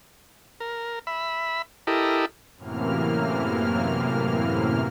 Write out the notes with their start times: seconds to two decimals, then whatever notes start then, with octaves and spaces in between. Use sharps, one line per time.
0.60 A#4
1.07 E5 B5
1.87 E4 G4 A4 A#4 D#5
2.57 F#2 A2 C3 E3 A#3 F6